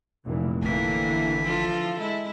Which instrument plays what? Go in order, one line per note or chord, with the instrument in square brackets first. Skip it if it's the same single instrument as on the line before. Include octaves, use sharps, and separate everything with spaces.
[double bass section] F1 A#2 E3
[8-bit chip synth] G#1 B6 [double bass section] D3 E3 [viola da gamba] A#3
[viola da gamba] F3 F4 A4
G#3 E4